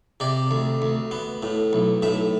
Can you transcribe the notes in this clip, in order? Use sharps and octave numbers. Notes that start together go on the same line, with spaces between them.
C3 D5
D2
D2
B3
A2
B1
A2 E5